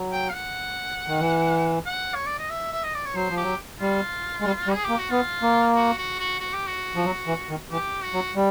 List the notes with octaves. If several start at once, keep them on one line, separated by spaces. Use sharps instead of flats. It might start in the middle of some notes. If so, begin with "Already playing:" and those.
Already playing: F#3
G5
F5
F#5
D#3
E3
F#5
C#5
D5
D#5
E5
E5
D#5
D5
C#5
F#3 C5
F3
G4
F#3
G3 F4
G#3
G3
G3
G#4
A#3 G4
F#4
B3 F4
A#3
F#4
F#4
F#4
F#4
G4
F#4
F3
F#3
E3
D#3
E3 G4
F#4
F#3
G3